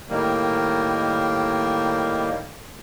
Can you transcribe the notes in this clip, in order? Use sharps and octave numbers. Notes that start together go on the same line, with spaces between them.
A2 D#3 G3 A#3